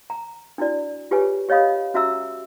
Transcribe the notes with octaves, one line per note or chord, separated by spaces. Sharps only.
A#5
D4 E4 F#4 D5
F4 G4 G#4 B4 C#5 G#5
G4 C#5 D#5 F5 B5 D#6
C#4 F#4 E5 A#5 E6